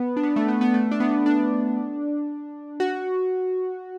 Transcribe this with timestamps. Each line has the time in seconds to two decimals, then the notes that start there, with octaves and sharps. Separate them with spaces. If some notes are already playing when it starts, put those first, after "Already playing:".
Already playing: B3
0.17 D4
0.23 B3
0.36 A3
0.48 B3
0.61 B3
0.74 A3
0.91 D4
1.00 B3
1.26 D4
2.80 F#4